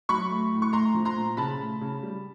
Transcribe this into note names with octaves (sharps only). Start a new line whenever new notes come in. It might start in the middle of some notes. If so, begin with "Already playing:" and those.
F#3 B5 C#6
A3
A2
C#6
A3 A#5 C6
F3
A#5 C6
A#2
C#3 A5 B5
A3
C#3
G3